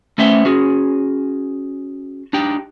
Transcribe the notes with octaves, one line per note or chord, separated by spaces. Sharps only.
A3 B3 C#4 C5 E5 G5
C#4 F#4 G#4
D4 D#4 G4 G5